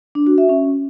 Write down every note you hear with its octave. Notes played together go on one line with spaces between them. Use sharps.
D4
F#4
E5
C#4